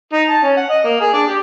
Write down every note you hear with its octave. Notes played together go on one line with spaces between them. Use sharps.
D#4
A5
C#4
F#5
D#5
A#3
G#4
D4
G4